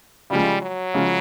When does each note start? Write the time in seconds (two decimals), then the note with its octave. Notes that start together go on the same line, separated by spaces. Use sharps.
0.30 C#3 F3 G3 G#3
0.62 F#3
0.94 C#3 F3 G#3